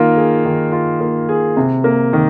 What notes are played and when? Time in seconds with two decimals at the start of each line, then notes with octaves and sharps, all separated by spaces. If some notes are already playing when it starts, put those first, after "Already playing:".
Already playing: D#3 A#3 F4
0.16 G#4
0.45 D#3
0.72 F4
1.01 A#3
1.29 G#4
1.57 C3
1.84 A#3
2.13 D#3